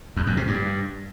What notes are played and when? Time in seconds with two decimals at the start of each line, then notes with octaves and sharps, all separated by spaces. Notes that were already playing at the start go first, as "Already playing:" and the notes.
0.17 E2
0.27 F#2
0.37 C3
0.47 G2